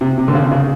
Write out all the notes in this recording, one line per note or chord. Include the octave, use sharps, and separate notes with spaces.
C3
C3
D3
C#3
C#3